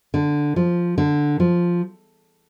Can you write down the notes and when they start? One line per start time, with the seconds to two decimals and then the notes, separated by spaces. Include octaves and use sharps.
0.14 D3
0.56 F3
0.98 D3
1.40 F3